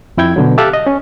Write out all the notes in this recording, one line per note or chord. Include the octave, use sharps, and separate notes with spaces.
F2 E4 G5 G#6
B2 D3 F#3
G4 A4 E5 F5 D6 F#6
D#5
C#4